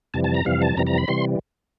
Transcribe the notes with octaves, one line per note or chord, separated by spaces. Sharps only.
F2 C3 E3 G3 A5
A5
A#5
F2 C3 E3 G3 F5
A5
F2 C3 E3 G3 A#5
A#5
B5
C3 E3 G3 C6